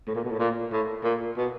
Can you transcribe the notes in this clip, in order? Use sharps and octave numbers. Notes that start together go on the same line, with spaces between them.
A2
A#2
B2
A2
A#2
A2
A#2
B2